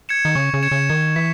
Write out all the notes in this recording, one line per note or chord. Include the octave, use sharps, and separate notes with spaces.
G#6 C#7 E7
D#3
C#3 C#6
C#3
G#6 C#7 E7
C#3
D#3 G#6
E3 B6